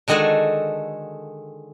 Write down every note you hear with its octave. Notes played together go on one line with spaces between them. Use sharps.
D3 D#3 G#3 F#4 G#4 A4